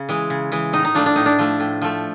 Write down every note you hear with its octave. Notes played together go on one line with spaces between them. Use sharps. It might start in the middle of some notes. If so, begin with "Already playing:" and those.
Already playing: C#3
E3 G#3
C#3
E3 G#3
A2 D#4
D#4
F3 A3 D4
D4
A2 D#4
D4
F3 A3
A2
F3 A3